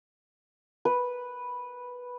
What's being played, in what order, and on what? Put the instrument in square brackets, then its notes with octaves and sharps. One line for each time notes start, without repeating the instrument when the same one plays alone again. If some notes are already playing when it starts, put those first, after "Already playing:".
[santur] B4